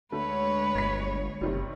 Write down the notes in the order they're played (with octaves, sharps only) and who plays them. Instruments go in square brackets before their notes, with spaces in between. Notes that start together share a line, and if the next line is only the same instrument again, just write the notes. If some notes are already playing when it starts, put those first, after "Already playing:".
[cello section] D2 G#3 C#5 [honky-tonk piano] D3 A3 [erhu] B4
[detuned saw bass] G1 [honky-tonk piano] G#6 B6
[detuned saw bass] F#1 [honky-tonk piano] C3 D#3 G3